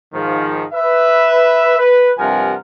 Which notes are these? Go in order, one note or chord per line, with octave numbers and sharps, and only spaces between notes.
G#2 D#3 F3
B4 E5
B4
G2 C3 F3 A#4 F#5 G#5